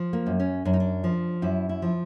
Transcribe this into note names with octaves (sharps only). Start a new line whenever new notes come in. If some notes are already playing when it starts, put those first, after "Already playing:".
Already playing: F3
A#3
F#2
C#4
F#2 D4
D#4
D4
F3
F#2 E4
E4
F3